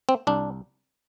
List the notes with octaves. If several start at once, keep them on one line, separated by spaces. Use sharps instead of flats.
C4
C2 D4